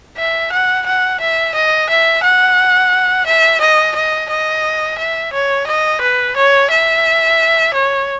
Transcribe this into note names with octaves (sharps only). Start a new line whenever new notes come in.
E5
F#5
F#5
E5
D#5
E5
F#5
E5
D#5
D#5
D#5
E5
C#5
D#5
B4
C#5
E5
C#5